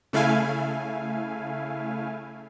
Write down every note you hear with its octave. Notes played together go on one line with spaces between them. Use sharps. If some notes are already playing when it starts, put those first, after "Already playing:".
C#3 A3 E4 F5 G#5